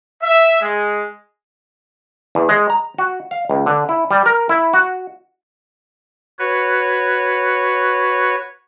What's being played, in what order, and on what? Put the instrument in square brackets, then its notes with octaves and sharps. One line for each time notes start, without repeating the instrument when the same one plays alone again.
[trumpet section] E5
G#3
[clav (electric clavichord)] E2
G#3
A#5
F#4
F5
C#2
D3
E4
G3
A#4
E4
F#4
[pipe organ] F#4 B4 C#5